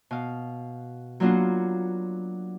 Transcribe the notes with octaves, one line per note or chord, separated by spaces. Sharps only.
B2 F5
F#3 A#3 B3 D4 F4 F#4